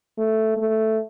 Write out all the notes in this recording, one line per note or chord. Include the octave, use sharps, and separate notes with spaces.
A3
A3